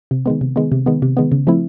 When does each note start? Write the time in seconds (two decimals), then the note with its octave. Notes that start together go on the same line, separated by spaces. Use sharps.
0.11 C3
0.26 D#3 G#3 B3
0.41 C3
0.56 D#3 G#3 B3
0.72 C3
0.86 D#3 G#3 B3
1.02 C3
1.17 D#3 G#3 B3
1.32 C#3
1.47 F3 A3 C4 E4